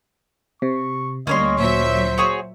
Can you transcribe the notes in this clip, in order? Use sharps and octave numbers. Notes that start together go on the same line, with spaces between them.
C3 C#6
D2 G3 A#3 C#4 C#5 D#5 C6
A#2 F#3 C5 E5
F#4 G#4 C#5